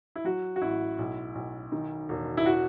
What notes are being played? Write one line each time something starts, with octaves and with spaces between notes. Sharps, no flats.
E4
F#3 F#4
F#4
A1 E4
B1
B1
D#3
E1
E4
F#4